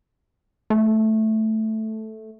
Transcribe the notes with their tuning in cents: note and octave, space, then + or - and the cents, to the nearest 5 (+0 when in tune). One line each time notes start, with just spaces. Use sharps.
A3 -5